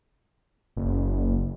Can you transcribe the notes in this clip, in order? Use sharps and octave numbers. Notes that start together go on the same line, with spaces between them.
F#1